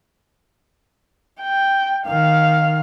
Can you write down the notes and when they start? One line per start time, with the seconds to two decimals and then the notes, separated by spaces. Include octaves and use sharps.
1.41 G5
2.07 D#3 F5